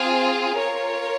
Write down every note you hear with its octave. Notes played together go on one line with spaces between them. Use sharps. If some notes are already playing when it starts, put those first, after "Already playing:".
Already playing: C4 F4 G#4
F4 A#4 C#5